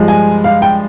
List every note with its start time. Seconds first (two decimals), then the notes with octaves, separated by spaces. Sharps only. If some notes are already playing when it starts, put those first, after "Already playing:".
Already playing: G2 F3 G#3
0.08 G#5
0.44 F5
0.62 G5